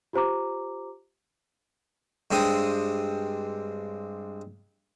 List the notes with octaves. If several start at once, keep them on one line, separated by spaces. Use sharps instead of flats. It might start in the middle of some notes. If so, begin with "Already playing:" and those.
F4 G4 C5 A#5 D6
G2 G#3 C4 D#6